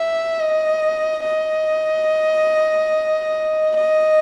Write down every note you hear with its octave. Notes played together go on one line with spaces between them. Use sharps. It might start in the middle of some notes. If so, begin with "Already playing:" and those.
Already playing: E5
D#5
D#5
D#5